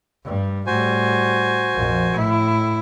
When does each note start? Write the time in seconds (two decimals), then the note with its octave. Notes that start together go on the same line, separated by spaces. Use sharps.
0.24 G2 G3
0.67 A2 G3 F#4 C5 G#5
1.74 A#1 F2
2.12 A2 E4